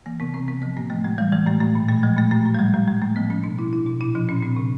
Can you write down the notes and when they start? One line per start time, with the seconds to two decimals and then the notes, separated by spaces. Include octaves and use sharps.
0.06 E3 A#3
0.20 C3 B3
0.34 C3 C4
0.48 C3 B3
0.62 F3 B3
0.77 A2 A#3
0.90 F3 A3
1.04 A2 G#3
1.18 E3 G3
1.32 E3 G#3
1.47 A2 A3
1.60 A2 A3
1.75 A#2
1.89 A#2 A3
2.03 F3 G#3
2.17 A#2 A3
2.31 A2 A3
2.46 A2
2.55 G3
2.59 F3 G#3
2.74 A2 G3
2.87 A2 G#3
3.02 A2 A3
3.16 F3 B3
3.30 F3 C#4
3.44 B2 D4
3.58 B2 E4
3.73 B2 E4
3.86 B2
4.00 A#2 E4
4.15 F3 D4
4.29 A#2 C#4
4.42 A#2 C4
4.56 C3